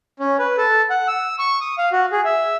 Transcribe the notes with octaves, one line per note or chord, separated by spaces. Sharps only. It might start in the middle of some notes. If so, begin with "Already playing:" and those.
C#4
B4
A4
F#5
E6
C#6
D#6
F5
F#4
G#4
E5